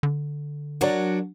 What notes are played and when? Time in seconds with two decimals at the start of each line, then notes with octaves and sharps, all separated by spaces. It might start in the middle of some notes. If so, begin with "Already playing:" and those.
0.03 D3
0.81 F#3 D4 F#4 A#4 C#5 D5